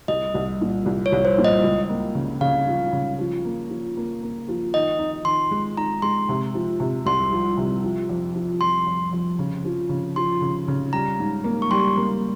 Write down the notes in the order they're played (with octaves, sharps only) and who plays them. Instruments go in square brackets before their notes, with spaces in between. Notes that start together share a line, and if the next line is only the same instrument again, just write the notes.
[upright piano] C2 [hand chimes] D#5
[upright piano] C2
A#2
C2
[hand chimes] C#5
[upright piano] C2
[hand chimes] C5
[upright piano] A#2
[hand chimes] D#5
[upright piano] C#2
A#3
C#3
[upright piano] C#3 [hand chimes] F5
[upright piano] F3
C#3
F3
A#3
F3
A#3
A#3
F3
[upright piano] D#3 [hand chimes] D#5
[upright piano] D#4
[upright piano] D#3 [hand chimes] C6
[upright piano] G#3
[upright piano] D#4 [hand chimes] A#5
[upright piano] G#3 [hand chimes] C6
[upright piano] C3
F3
C3
[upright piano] C2 [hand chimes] C6
[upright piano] F3
C3
F3
F2
F3
[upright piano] F2 [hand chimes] C6
[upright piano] F2
F2
C#3
F3
C#3
[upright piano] F3 [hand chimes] C6
[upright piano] C#3
C#3
[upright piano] G3 [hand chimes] A#5
[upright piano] G#2
A#3
[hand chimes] C#6
[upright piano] G3 [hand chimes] C6
[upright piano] A#3